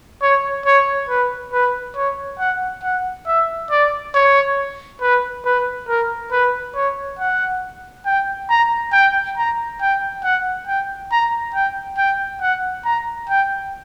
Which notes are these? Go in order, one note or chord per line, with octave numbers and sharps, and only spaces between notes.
C#5
C#5
B4
B4
C#5
F#5
F#5
E5
D5
C#5
B4
B4
A#4
B4
C#5
F#5
G5
A#5
G5
A#5
G5
F#5
G5
A#5
G5
G5
F#5
A#5
G5